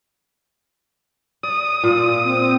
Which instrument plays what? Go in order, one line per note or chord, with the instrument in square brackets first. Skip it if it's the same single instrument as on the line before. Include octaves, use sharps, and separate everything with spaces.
[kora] D5 [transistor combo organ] D#6
[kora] A#2 [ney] F4
[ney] C4